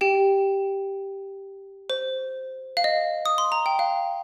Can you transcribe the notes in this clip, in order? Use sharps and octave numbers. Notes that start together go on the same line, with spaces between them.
G4 G5
C5
F5
D#5
D#6
C6
A#5
G5
F5